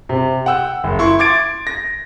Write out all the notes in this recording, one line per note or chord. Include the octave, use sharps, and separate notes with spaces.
C3
F#5 G5 E6
F#1
E4 C6 C#6
C6 D6 G#6 A6 D7
A#6